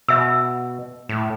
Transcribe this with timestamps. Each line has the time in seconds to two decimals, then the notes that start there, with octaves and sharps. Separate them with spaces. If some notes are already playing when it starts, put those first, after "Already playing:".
0.08 B2 E5 E6
1.09 A2